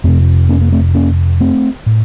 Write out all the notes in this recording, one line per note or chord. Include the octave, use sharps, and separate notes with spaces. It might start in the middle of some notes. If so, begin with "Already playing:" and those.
F2 C3 A3 C4
A#3 C#4
A#3
A3 C4
A#3 C#4
A3 C4
A2